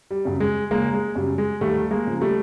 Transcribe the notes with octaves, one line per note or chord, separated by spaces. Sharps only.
G3
F#2 C#3
G#3
F#1 G#3 A#3
G#3
F#2 C#3 G3
G#3
D#2 G3 A3
G#3 A#3
C#3 F3
G3 A3